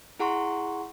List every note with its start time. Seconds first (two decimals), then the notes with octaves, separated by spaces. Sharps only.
0.19 E4 G#4 F#5 A#5 C6 C#6